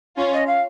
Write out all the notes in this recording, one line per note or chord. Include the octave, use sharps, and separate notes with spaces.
C#4 F4
D#5
F5